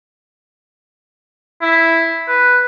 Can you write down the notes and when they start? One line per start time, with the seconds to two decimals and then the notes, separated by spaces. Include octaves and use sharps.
1.61 E4
2.28 B4